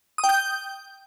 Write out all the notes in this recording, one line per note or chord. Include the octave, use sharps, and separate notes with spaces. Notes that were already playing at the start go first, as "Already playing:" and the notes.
D#6
G5
G6